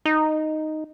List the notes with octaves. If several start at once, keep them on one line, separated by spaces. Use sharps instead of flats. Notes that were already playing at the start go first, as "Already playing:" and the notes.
D#4